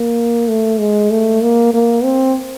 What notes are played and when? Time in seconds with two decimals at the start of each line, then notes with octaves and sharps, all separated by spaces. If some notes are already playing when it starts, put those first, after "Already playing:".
Already playing: A#3
0.48 A3
0.79 G#3
1.11 A3
1.42 A#3
1.74 A#3
2.04 C4